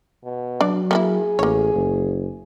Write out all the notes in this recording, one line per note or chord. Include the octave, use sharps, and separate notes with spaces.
B2
F#3 D4 D5
A#3 C#4 E4 G#4
A1 A#3 C#5
F#1